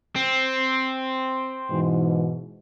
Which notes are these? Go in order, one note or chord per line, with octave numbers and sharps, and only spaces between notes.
C4
G#2 B2 E3